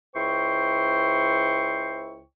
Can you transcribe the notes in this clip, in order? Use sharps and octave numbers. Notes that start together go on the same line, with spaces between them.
C#2 E4 C5 G5 C#6